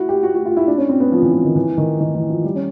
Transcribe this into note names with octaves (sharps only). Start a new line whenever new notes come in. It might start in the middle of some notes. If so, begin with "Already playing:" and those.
Already playing: E4 F#4
G4
F#4
F#4
F4
E4
D4
C#4
C4
B3
F3
E3
E3
D#3
E3
D#3
D#3
E3
F3
G3
C#4